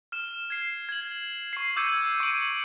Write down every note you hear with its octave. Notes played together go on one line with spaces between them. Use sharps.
F6 E7
G#6 C7
G#6 F#7
C#6 C7
D6 E6 G6 G#6 C#7 D#7
C#6 C#7 D7 F#7